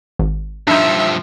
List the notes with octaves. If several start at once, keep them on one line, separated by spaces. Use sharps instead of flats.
G#1
G2 F3 D4 D#4 E5